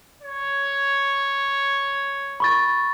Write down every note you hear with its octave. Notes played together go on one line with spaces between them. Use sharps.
C#5
B5 C#6 A6